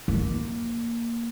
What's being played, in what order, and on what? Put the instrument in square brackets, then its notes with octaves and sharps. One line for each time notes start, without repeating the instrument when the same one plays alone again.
[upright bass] A#3